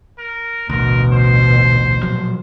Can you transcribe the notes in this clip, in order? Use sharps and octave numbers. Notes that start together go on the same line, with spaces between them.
A#4
A1 D2 B2 A#4
C5
A#2 F3 F#3